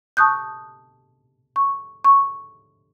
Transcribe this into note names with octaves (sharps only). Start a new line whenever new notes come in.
A5 C#6 D#6 F#6 G6
C#6
C#6